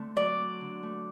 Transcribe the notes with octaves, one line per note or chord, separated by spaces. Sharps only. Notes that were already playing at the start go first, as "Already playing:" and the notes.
Already playing: D3 A3 C4
F#3 D5
C4
D3
A3